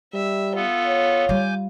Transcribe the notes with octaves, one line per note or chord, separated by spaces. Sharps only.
G3 E5
B3 F4 A4
C#5
G3 G#5 D6 G6